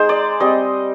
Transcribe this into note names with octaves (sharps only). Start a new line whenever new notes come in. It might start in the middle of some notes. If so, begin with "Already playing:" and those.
Already playing: G#3 D#4 G#4 C5
D5
G3 C4 D#5